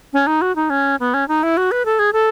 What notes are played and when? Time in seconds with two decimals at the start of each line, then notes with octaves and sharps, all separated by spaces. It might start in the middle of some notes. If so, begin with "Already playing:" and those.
0.13 C#4
0.27 D#4
0.42 F#4
0.56 D#4
0.70 C#4
1.00 B3
1.14 C#4
1.28 D#4
1.43 E4
1.57 F#4
1.71 B4
1.85 A4
1.99 G#4
2.13 A4